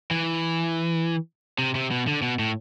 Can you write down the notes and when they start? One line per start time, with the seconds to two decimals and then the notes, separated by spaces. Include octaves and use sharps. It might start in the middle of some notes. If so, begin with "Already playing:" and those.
0.11 E3
1.59 C3
1.75 C3
1.91 B2
2.07 D3
2.22 B2
2.39 A2